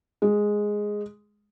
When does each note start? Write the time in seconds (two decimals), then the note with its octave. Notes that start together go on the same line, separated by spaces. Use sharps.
0.22 G#3